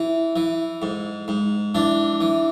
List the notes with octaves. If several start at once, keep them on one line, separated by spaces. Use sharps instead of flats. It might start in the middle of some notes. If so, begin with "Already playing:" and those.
Already playing: E3
E3
G#2
G#2
E3 D4
E3